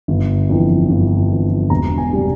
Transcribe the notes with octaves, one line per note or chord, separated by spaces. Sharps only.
G1
F2 E3
G1
F2 E3
E1 A#5
G#5
C3 G3